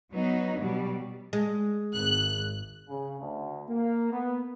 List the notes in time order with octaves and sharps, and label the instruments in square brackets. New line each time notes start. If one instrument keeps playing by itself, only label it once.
[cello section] F#3 B3 D#4
B2 F#3 G3
[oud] G#3
[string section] G#1 F#6
[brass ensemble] C#3
D2
A#3
B3